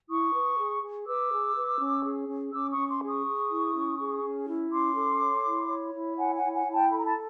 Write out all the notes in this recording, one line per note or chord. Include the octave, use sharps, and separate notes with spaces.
E4 C#6 D#6
B4
G#4
G#4
B4 D6 E6
G#4
B4
C#4
G#4
C#4
C#4 D6 E6
C#6 D#6
C#4
C6 D6
G#4
C#6 D#6
G#4
E4
C#4
G#4
C#4
E4
C#4 C6 D6
A4
C#5
E4
C#5
E4
C#5 F#5 G#5
F#5 G#5
E4
F#5 G#5
E4
G5 A5
A4 B5
A#5
A5 B5